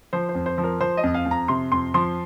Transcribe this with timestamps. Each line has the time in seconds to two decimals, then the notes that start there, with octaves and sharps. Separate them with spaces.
0.13 F3 C5
0.29 C5
0.35 F2
0.46 C5
0.58 F3
0.64 A#4
0.80 F3 C5
0.97 D#5
1.03 F2
1.14 F5
1.26 F2
1.31 A#5
1.48 C3 C6
1.72 F2 C6
1.94 F3 C6